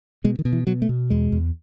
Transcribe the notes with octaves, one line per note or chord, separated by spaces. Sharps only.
B2 G#3
D#3
B2
E3
B2 F#3
A3
B2
E2 G#3
E2